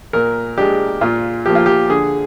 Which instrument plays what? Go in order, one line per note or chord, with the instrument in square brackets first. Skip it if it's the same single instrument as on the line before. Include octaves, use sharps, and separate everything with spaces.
[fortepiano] A#2 A#4
G#3 D4 G4
A#2 F4
F3 A#3 G4
F4
G4
D3 G#4